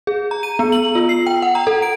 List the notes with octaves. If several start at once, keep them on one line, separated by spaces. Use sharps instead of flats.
G#4
A#5
D#7
B3
F#7
F4
C7
G5
F#5
A#5
A4
D7